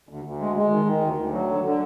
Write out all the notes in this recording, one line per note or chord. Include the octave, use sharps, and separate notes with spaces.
D2
D2
G#3
G#3
D#3
D#3
D2
D2
F#3
D3
D3